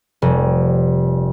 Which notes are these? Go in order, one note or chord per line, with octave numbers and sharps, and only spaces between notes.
F1 G3